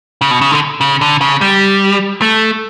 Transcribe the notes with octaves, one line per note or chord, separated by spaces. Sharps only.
C#3
B2
C#3
D3
C#3
D3
C#3
G3
A3